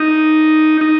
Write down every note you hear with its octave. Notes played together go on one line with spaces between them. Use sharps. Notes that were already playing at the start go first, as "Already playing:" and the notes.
Already playing: D#4
D#4